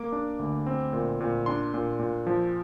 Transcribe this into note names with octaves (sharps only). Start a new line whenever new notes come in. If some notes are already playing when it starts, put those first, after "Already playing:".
Already playing: A#3 D6
D4
D2
C4
A#2
A#2
D4 C6
A#2
A#2
F3